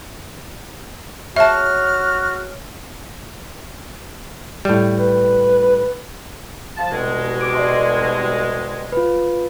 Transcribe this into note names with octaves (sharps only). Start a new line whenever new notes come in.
F#4 G#4 C#5 E5 A5 F6
A2 G3
B4
F3 A5
C2 B2 G#3
D6 D7
D5 D#5 C6
F4 B4